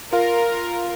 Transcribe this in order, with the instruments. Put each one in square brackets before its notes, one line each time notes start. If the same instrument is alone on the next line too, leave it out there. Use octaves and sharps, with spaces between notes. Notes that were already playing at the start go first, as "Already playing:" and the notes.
[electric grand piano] F4 F5 [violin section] A#4